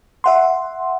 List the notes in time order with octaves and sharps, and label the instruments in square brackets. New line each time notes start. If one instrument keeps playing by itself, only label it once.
[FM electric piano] E5 F#5 C6